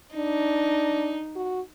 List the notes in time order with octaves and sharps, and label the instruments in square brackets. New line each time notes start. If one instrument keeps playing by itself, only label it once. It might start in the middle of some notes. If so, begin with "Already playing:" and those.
[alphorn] D4 [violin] D#4
[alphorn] F#4